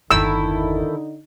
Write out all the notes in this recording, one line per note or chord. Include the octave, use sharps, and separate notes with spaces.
G1 E2 D3 D#3 D#4 E4 A4 E6